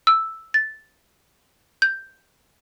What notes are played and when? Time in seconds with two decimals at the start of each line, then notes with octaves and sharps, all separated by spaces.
0.07 E6
0.54 A6
1.82 G6